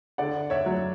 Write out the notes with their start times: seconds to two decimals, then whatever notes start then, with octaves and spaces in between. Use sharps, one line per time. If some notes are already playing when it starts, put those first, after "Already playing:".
0.18 D3 D5 F#5
0.50 C#5 E5
0.66 F#3